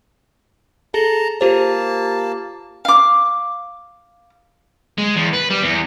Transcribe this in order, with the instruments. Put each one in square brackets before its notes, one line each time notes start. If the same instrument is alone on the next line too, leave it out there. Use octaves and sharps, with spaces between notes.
[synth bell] G#4 A4 [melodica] A5 A#5
[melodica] A#3 A5 [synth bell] F4 G4 C5
[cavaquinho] F5 D6
[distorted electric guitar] G#3
E2
B4
G3
E2